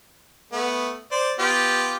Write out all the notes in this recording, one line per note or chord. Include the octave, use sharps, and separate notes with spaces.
A3 B3
C5 D5
B3 F4 G4